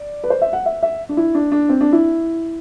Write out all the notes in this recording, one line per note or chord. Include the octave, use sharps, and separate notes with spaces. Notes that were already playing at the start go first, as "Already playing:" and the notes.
Already playing: D5
B4
C5
E5
F#5
E5
E5
D4
E4
D4
D4
C4
D4
E4